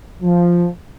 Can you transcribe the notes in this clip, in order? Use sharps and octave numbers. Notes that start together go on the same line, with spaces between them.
F3